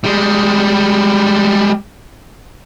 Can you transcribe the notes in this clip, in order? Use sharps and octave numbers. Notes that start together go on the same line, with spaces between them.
G3 G#3